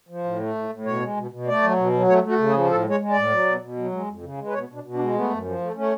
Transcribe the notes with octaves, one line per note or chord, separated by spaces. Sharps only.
F3
A2
A3
A2
A2
B2 C#5
G#3
B2
B2
A3 D5
F#3
B2
F#3
A3 C#5
A3 F#4
C#3
G#4
F3
A2 A4
G#3
C#5
G#3
D5
A2
F#3
B2
B2
F#3
G#3
F2
C#3
G#3
B4
B2 C#5
B2 D4
B2
D4
G#3
A3 B3
F#2
F3
A3
A3 C#4